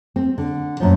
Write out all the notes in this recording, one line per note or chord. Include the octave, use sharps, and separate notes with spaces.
C4
D3
F#2 A#2 F3